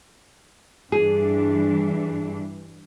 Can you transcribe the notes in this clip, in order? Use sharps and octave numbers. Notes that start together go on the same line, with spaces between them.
G2 E3 D4 G#4